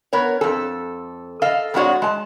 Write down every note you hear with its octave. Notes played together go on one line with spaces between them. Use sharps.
B3 A#4 C#5
F2 A4
A4 D#5 F5
F2 G#3 D4 F#4 C#5 D5
G#3 A5